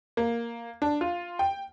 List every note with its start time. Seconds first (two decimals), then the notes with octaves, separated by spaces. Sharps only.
0.17 A#3
0.82 D4
1.01 F4
1.39 G5